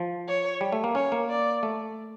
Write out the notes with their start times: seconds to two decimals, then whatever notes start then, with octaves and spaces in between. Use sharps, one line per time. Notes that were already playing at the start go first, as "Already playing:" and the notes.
Already playing: F3
0.28 C#5
0.61 G3
0.72 A3
0.84 A#3
0.95 C#4 C#5
1.12 A#3
1.29 D5
1.63 A3